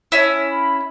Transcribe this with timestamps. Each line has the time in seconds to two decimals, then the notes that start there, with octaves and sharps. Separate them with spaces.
0.12 C#4 E4
0.48 B5